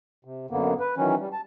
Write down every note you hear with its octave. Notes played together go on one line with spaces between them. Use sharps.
C3
F#2 D3 A#3 B3
B4
D#3 E3 F#3 C#4
G3
A5